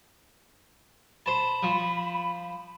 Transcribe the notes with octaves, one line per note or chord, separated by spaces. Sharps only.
C5 A5 B5
F3